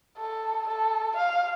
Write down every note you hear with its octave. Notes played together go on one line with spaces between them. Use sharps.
A4
A4
F5